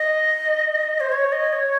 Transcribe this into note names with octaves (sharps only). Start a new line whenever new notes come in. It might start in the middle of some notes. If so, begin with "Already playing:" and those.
Already playing: D#5
C5
C#5
D#5
C#5